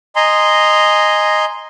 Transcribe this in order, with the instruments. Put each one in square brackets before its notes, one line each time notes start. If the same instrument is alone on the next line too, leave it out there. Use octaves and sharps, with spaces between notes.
[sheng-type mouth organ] D#5 G#5 A#5 C6